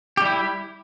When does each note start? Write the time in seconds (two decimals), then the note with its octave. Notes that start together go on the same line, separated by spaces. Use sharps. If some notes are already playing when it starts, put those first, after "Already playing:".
0.17 G4
0.21 G3
0.25 E4